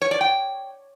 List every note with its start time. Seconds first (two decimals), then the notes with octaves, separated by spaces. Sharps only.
0.02 C#5
0.11 D5
0.21 G5